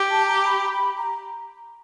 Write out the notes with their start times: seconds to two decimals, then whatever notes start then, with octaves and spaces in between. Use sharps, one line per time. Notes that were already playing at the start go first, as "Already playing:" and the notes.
Already playing: G4
0.11 A5
0.27 A#5
0.45 B5
0.72 B5
0.97 A#5